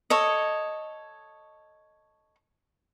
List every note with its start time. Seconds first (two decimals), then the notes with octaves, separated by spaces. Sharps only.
0.10 A4 C#5 D#5